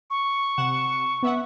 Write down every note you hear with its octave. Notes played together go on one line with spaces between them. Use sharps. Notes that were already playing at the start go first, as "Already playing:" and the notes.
C#6
C3 F#5 E7
B3 E5 F#5